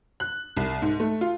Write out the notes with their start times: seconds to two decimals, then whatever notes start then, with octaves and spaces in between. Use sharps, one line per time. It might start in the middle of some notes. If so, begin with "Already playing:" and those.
0.20 F#6
0.57 C2
0.82 G#2
1.00 A3
1.21 F4